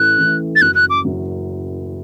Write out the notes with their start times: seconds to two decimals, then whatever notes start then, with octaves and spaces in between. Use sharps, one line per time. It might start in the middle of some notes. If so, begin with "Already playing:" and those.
Already playing: A1 A2 E3 A3 F#6
0.17 A1 A2 E3 A3
0.56 A6
0.61 F#1 F#2 F#3 F#6
0.75 F#6
0.90 D6
1.04 F#1 F#2 F#3